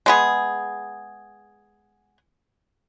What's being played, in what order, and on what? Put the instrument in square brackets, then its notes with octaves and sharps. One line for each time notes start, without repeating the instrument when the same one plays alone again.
[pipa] G#3 B3 G#4